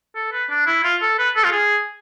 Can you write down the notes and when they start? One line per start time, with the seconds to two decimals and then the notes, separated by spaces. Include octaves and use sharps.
0.16 A4
0.32 B4
0.50 D4
0.67 E4
0.84 F4
1.01 A4
1.18 B4
1.36 A4
1.44 F4
1.52 G#4